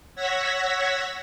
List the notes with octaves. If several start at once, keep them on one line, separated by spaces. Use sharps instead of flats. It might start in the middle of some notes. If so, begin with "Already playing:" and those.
C#5 F#5 E6 G#6 A#6 B6